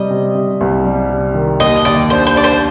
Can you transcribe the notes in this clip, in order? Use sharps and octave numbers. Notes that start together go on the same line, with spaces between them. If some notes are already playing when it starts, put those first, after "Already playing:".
Already playing: C3 G3 D#5
C3
C3
C2
G3
C3
D#3
D#2 D#5
D#2 D5
D4 C5
C5
D4 D5
C5